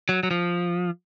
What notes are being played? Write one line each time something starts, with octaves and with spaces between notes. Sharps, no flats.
F#3
F#3
F3